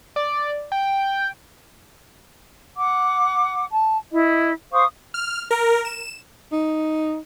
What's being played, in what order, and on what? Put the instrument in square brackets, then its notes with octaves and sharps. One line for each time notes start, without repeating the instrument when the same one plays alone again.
[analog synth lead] D5
G5
[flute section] F#5 D6
A5
E4 D#5
C5 F5 C#6 D#6
[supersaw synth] F6
A#4
E7
[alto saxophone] D#4